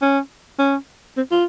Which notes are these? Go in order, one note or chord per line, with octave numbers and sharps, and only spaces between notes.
C#4
C#4
C4
F4